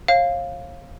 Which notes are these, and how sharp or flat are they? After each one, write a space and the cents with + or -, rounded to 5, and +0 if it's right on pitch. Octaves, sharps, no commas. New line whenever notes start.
C#5 -40 F5 +0